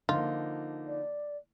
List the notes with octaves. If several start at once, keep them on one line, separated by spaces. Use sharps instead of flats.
D3 F3 A#3 D#4 F4
D5